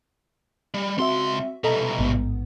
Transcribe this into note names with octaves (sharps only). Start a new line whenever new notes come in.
G3
C#2 C4 F#4 E5 C6
C2 B2 A4 D#5 A#5
A1 G#2 B3